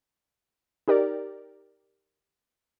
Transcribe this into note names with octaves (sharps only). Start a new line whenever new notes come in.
D#4 G4 A#4 D5